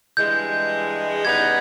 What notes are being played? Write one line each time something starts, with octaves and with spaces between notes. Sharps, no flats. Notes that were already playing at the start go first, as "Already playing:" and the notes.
G2 E3 G#3 G6
C#3 G3 B3 D#4 G#6